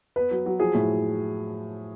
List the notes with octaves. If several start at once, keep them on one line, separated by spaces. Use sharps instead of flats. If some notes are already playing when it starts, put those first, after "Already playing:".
B3 B4
F#3
F#3
F3 G#4
A2